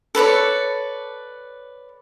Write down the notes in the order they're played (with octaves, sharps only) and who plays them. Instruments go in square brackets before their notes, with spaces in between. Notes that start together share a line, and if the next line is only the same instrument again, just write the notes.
[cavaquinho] A4 B4 C#5 D5